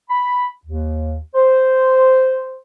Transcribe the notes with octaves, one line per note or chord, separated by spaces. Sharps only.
B5
D#2
C5